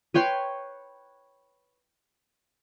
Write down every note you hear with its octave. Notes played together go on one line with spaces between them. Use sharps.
B4 C#5 G5 C6